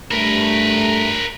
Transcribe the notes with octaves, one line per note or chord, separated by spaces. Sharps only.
G2 A3 A#4 B4